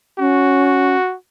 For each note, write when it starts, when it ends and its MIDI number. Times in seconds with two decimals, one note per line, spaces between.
0.19 0.95 61
0.19 1.15 66